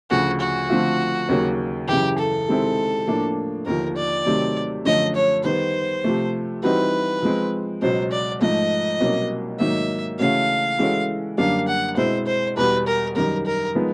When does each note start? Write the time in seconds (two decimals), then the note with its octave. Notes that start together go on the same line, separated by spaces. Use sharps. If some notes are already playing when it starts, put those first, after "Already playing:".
0.10 D2 C#3 F3 F#4
0.41 F#4
0.70 D3 F3 A3 C4 F4
1.28 D#2 C#3 F#3 A#3
1.88 F#2 C#3 E3 G4
2.19 A4
2.48 C3 D#3 G#3 C4 E4
3.07 A2 F3 A#3 D4
3.66 D#2 D3 F3 A#4
3.96 D5
4.26 C3 D#3 F#3 A3 C4
4.85 F#2 D3 F3 A3 C#4 D#5
5.15 C#5
5.44 D#3 G3 B3 C5
6.04 C3 F3 A3
6.63 E3 G3 C4 D#4 F#4 B4
7.22 F3 G#3 C4
7.82 C#2 B2 F#3 C5
8.11 D5
8.41 G#2 F3 A3 D#5
9.00 C2 B2 F#3 A#3 C#4
9.59 G#2 D#3 F#3 A#3 D#4 E5
10.19 C#3 E3 A3 C#4 F#4 F5
10.79 E3 G#3 C#4 F#4 A4
11.38 F#2 D3 G3 A#3 D4 F5
11.68 F#5
11.97 B2 G#3 C4 E4 C5
12.27 C5
12.57 E2 B2 G3 B4
12.87 A#4
13.16 F#2 D#3 G3 A#4
13.46 A#4
13.75 F3 G#3 B3 D#4